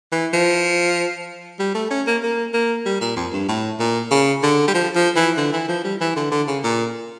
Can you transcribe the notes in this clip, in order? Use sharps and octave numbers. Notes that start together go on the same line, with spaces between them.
E3
F3
G3
A3
C#4
A#3
A#3
A#3
G3
A#2
F2
G2
A2
A#2
C#3
D3
G3
F3
F3
E3
D3
E3
F3
G3
E3
D3
D3
C#3
A#2